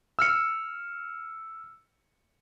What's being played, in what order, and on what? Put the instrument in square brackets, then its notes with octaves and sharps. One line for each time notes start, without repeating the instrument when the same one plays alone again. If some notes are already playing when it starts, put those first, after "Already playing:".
[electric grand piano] E6 F6 C#7